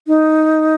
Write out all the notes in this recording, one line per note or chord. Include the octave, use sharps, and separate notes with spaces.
D#4